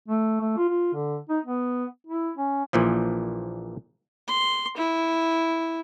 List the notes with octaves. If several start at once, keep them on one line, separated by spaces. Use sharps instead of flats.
A3
A3
F4
F4
D3
D#4
B3
E4
C#4
A#1 A#2 E3 F3
C6
E4